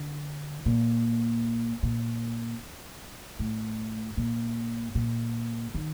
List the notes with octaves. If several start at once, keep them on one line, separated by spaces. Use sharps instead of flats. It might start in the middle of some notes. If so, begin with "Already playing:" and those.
Already playing: D3
A#2
A#2
A2
A#2
A#2
D#3